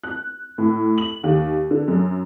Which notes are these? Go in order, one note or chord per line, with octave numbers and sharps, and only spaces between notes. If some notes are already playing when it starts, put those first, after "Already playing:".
F#6
A2
F#7
D#2
D3
F#2